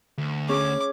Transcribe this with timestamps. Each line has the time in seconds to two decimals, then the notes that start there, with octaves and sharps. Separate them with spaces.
0.18 D2
0.49 C#4 G#4 D6